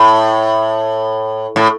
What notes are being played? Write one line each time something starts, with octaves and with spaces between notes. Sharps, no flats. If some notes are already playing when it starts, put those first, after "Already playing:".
Already playing: A2
A2